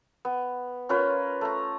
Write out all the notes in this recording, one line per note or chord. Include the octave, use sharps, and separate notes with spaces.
B3
C#4 F4 A#4 B4
A3 A#5